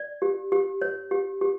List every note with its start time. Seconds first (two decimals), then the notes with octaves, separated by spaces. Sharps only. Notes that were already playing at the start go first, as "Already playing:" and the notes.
Already playing: D5
0.22 G4
0.52 G4
0.82 C#5
1.11 G4
1.41 G4